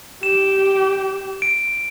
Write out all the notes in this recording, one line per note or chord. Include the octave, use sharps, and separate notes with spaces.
G4 E7
D7